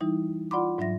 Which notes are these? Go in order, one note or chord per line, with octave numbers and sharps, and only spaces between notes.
E3 G3 D#4 E4
F4 D5 F#5 B5 C6 D6
G#2 F#3 D4 E5 A#6